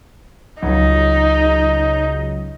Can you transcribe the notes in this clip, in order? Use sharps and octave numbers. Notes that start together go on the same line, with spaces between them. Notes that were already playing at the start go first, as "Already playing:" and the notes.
C#2 C#3 F#3 D#4